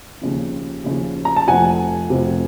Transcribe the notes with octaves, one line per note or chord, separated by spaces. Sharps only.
D#2 C#3 F3
D#2 C#3 F3
A#5
A5
F1 F2 C3 F#5 G#5
F1 F2 C3